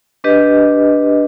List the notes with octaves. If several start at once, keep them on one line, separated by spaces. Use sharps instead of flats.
D4 G4 B4 D#5